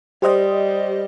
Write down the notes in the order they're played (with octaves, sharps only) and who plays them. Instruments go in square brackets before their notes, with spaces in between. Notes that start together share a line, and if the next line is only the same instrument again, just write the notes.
[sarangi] G3 [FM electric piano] G4 C5 D#5